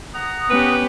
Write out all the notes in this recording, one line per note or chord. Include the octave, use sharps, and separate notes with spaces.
F#5 A#5 D#6
B3 C#4 G4 B4